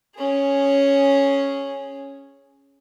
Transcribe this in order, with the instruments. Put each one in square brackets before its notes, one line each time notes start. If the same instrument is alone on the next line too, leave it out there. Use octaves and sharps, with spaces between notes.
[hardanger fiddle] C#4 G#4